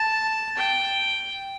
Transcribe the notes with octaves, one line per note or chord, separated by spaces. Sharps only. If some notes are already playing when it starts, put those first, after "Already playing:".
Already playing: A5
G5